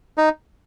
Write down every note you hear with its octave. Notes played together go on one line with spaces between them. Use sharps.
D#4